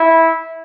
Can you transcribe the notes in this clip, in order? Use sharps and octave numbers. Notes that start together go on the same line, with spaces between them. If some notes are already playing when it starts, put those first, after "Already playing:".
Already playing: E4